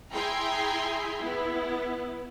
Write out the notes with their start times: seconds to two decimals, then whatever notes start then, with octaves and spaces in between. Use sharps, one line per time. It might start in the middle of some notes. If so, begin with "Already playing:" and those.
0.13 E4 G#4 G5 G#5 A#5 C6
1.21 B3 E4